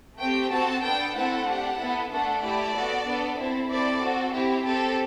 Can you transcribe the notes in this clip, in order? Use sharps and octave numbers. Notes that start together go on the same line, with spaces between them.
A3 C4 G4 G5
C4 F#4 A4 A5
B3 D4 A4 G5
A3 C4 E4 A4 F#5
D4
G4
B3 E4 A4
A3 D4 A4 F#5
A3 E4 G4 D5
B3 F#4 A4
B3 D4 A4
C4 E4 A4
C4 E4 A4 D5
C4 F#4 A4
C4 E4 G4
C4 G4 A4